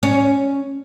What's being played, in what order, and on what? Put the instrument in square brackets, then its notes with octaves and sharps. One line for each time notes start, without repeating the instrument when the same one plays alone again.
[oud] C#4